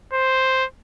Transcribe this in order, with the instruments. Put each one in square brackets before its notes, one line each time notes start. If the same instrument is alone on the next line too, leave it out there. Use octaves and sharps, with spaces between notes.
[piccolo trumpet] C5